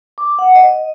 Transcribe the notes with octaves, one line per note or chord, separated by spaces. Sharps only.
D6
F#5
D#5